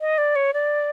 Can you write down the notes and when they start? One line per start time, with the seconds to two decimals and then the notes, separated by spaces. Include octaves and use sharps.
0.01 D#5
0.18 D5
0.36 C#5
0.54 D5